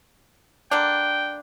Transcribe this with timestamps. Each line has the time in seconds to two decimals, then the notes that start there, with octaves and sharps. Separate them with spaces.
0.71 D3 A#3 D4 G5